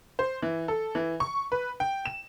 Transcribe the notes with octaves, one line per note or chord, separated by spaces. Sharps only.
C5
E3
A4
E3
C#6
B4
G5
E7